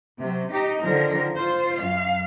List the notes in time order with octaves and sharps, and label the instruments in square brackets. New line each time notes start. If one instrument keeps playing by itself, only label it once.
[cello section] C3 F#3
D#4 G4
D3 D#3 F3 A#4
F4 C5
F#2 F5